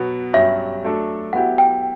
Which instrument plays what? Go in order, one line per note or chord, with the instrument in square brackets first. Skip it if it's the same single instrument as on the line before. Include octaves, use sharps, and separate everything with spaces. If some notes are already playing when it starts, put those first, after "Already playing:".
Already playing: [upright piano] B2 F#3 B3 F#4
[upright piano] G2 F#3 C#4 G4 [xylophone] E5
[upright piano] F#3 A3 D4 A4
[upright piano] F#3 B3 E4 G4 [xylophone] F#5
[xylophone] G5